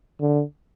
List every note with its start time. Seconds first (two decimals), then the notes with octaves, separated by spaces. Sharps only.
0.21 D3